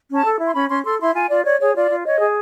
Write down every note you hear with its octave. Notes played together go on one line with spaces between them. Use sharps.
C#4
A5
A4
E4
C6
C#4 B5
C#4 C6
A4 C6
E4 C6
F4 G#5
F4 D5
C#5 D5
G#4 C#5
F4 D5
F4
C#5 D#5
G#4